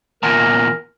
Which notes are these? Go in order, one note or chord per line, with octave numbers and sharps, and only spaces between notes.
E2 A#2 A#4